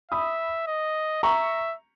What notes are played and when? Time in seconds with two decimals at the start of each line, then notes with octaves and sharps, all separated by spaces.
0.11 E5 B5 D#6
0.67 D#5
1.23 E5 A#5 C#6